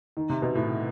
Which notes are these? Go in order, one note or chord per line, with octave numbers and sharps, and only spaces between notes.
D#3
C3
B2
A2